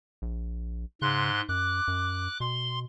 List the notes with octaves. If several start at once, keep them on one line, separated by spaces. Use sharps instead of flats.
A#1
G#2 C#3 C6 F#6
F#2 D6 F#6
F#2
B2 C6